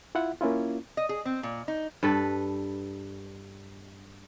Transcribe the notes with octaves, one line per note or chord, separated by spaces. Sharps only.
E4 F4 E5 F#5
A#3 C#4 E4 F4
D#5
G#4
C4
A#2
D#4
G2 A4 B4